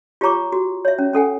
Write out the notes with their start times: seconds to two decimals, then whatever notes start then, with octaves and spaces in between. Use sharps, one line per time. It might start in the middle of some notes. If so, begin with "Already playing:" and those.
0.21 F4 G4 C#5 A#5 C#6 D6
0.52 F#4
0.85 C#5 E5
0.99 C#4
1.13 C#4 A4 F#5 G#5